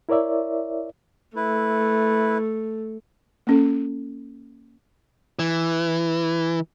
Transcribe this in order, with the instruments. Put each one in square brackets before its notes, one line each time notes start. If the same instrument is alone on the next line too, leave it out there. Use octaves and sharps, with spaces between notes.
[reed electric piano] E4 A#4 C#5 D5 E5
[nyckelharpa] A3 [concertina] E4 B4
[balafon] A#3 C#4 A4
[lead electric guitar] E3